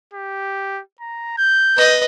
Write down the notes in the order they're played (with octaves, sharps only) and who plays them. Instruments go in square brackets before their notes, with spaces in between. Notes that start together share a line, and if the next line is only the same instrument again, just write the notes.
[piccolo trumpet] G4
A#5
G6
[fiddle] B4 D#5